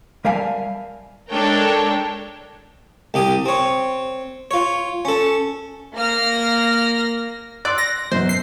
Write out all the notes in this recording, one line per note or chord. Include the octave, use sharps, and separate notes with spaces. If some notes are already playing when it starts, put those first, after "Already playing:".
G3 A#4 E5 F5 G#5 A5
G#3 D4 A4 A#4 C#5 G5
C2 G4 D#6
C4 C#5
F4 C#5
C#4 A4
A#3 F6 A#6
D5 C6 E6 F#6
A#6
F#2 B2 C5
C7